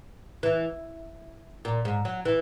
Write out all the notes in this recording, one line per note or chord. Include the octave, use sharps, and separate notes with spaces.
E3
A#2
G#2
F#3
E3